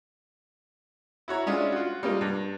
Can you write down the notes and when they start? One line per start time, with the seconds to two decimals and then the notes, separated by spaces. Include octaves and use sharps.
1.28 E4 F#4 C#5 A#5
1.46 G#3 C#4 D4 E4 F4
1.72 F4 F#4
2.03 G3 G#3 A#3 F4
2.21 G2